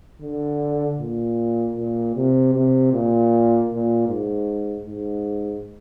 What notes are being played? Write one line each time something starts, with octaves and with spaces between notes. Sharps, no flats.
D3
A#2
A#2
C3
C3
A#2
A#2
G#2
G#2